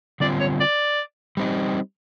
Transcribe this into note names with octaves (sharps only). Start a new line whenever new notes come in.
D3 G3 C4 F4 D5
C#5
D5
G3 C4 D#4